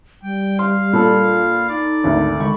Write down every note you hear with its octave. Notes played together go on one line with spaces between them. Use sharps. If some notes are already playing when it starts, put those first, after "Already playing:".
G3 G5
F5 C6
A#2 D4 A4 B5
D#4 D5
G#1 D2
D#3 G#3 B5 C#6